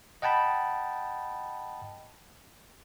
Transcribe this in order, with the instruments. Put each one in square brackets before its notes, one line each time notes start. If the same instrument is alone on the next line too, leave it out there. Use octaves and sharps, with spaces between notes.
[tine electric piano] D#5 F#5 G5 A5 B5